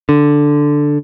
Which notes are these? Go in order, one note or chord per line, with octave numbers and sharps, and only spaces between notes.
D3